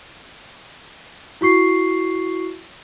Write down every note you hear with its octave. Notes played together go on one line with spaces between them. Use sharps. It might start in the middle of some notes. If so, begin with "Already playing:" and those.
E4 F#4 C#6 C7